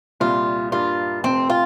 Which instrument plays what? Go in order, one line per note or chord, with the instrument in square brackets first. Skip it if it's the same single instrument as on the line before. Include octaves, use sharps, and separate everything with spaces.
[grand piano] C2 A#2 G3 [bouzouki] F4
[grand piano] G2 G3 A#3 [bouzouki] F4
[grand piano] F1 F2 C3 [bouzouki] C4
[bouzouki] F4